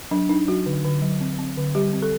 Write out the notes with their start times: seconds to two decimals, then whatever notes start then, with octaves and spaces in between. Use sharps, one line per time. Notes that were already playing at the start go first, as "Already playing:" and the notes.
0.11 F#3 D4
0.29 D4 D#4
0.48 F#3 F#4
0.66 D3
0.84 D3
1.02 F#3
1.21 C4
1.39 C4
1.57 D3
1.75 G3 G4
1.93 C4
2.02 A4